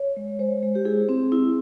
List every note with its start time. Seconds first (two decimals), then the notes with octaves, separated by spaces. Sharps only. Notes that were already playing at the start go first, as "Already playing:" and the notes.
Already playing: C#5
0.17 G#3
0.39 G#3 C5
0.63 G#3
0.75 G4
0.85 E4 G#4
1.09 C4
1.32 E4